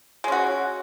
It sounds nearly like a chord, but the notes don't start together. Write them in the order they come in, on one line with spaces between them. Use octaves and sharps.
G#3 C#4 F#4